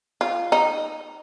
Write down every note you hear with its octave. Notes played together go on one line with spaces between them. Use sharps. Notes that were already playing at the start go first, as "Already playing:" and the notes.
F4
D#4